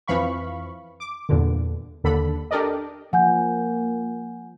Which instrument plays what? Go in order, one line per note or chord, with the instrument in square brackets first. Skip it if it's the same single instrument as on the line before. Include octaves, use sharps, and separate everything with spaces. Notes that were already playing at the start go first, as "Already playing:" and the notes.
[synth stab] F2 E3 F3 F5 B5 C#6
D6
E2 G2 A#2 D3
D#2 D3 A4 B5
D4 G4 A4 A#4 D5 D#5
[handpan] F3 [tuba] A#3 [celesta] F#5 G#5 G6